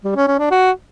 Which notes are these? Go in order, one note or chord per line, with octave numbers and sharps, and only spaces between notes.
G3
C#4
C#4
D4
F#4